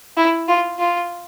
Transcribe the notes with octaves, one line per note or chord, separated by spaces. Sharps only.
E4
F4
F4